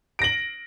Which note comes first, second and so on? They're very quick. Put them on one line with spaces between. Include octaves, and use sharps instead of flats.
D7 A#6 F#7